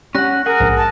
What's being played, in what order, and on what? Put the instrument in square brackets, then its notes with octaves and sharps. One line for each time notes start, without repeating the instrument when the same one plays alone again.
[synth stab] G3 [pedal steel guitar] C#4 F#5 [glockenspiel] F#6 A#6
[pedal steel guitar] G#4 F#5 [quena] A#4
[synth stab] A#1 G#2
[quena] A5